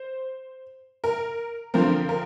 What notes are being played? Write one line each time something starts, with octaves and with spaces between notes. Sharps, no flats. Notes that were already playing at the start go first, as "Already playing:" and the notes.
Already playing: C5
A#4
D3 F3 C4 A#4
A#4